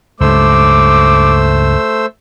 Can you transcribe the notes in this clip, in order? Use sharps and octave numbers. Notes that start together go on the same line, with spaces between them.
C#2 G2 A3 C5 D6 E6